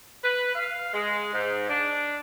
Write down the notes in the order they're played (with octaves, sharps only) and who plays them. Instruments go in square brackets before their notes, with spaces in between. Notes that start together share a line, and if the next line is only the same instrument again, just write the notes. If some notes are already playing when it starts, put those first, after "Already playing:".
[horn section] B4
F5
G#3
G#2
D4